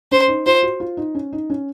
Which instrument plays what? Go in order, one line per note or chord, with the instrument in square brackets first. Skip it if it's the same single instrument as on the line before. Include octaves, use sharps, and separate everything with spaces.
[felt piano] C#4 [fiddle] C5
[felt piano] D#4
[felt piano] F4 [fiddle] C5
[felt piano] F#4
F4
D#4
C#4
D#4
C#4